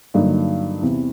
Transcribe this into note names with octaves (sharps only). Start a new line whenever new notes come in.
G2 D3 F#3 A#3 D#4
E2 C3 E3